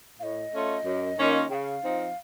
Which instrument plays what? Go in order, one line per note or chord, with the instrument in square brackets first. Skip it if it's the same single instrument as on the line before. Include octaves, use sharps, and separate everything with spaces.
[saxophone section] A2 [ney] F5
[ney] D#5
[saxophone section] A3 C#4 F4
F#2
D#3 A#3 C#4 F4
[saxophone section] C#3 [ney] F5 G5
[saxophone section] F3 C4 D#4